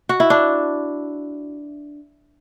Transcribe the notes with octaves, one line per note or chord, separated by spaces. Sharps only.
F#4
E4
D4